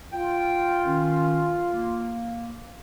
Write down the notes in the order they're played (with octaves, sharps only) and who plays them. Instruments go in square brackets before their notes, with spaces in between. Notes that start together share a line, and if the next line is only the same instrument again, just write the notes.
[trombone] F4 [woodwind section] G5
[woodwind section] D#3 C#4
A#3